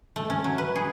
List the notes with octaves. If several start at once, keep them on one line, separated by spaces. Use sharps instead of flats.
A3
C#4
F#3
B4
G#4